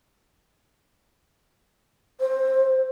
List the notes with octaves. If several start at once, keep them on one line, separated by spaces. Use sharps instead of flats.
C5